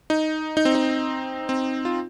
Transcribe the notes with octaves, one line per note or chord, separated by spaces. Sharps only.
D#4
D#4
C4
D#4
C4
F4